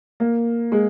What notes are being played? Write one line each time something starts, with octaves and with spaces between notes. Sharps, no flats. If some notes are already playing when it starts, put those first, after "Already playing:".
A#3
G#3